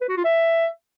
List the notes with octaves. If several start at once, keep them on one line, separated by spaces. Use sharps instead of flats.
B4
F#4
F4
E5